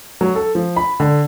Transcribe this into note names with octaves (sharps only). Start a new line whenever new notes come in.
F#3
A4
F3
B5
D3